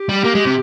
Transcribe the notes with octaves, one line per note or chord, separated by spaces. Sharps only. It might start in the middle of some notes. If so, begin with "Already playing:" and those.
Already playing: G4
G3
A#3
G#3
C3